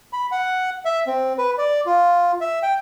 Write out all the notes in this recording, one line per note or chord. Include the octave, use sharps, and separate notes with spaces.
B5
F#5
E5
C4
B4
D5
F4
E5
G5